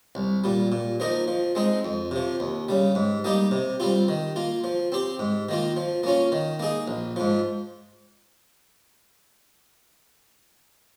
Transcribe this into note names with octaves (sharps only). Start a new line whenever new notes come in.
C2
A#2 G3
A#2
F3 A#3 D#4 A#4
F3
G#3 C4 D#4
F2
C3 F3
D#2
C#3 G3
G#2
G3 A#3 D#4 G4
C3
G3 C4 F4
D#3
A#3 F4
F3
C4 G4 C5
G#2
D#3 A#3 F4
F3
A#3 C#4 F4
D#3
A#3 D#4 G#4
A#1
G#2 F3